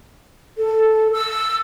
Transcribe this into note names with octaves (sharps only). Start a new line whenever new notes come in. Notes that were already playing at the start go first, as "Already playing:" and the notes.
A4
E6